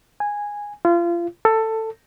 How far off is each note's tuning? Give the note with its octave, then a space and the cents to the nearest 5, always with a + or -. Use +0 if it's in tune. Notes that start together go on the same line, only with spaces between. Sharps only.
G#5 -10
F4 -30
A4 +15